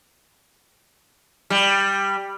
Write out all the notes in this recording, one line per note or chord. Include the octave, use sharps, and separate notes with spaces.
G3